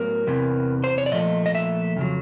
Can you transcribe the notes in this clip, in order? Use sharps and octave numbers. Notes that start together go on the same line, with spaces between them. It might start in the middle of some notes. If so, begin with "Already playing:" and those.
Already playing: A2 F#3 B3 A#4
E2 C3 E3
C5
C#5
D5
A#2 F3 A3 D#5
D#5
E5
F2 C#3 F#3